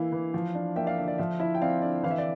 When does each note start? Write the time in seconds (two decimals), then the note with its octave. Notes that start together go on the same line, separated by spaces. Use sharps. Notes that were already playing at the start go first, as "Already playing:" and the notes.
Already playing: E3 A#3 E4 F5
0.12 E3
0.34 F3
0.55 D4
0.76 A#3 E5 G5
0.87 D5 F5
0.97 D3 E5
1.08 D5
1.18 F3 E5
1.40 E4 E5
1.55 G5
1.61 C4 D5 F5
1.82 D3 D5
2.03 E3 F5
2.11 E5
2.18 D5